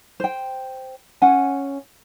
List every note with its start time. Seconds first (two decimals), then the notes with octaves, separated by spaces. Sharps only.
0.20 C5 G5
1.22 C#4 F#5 G#5